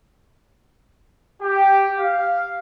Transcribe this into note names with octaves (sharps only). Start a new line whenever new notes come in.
G4
F5